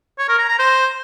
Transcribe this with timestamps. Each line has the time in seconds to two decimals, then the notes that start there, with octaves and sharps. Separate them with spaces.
0.18 C#5
0.28 A#4
0.38 A#5
0.49 A#5
0.59 C5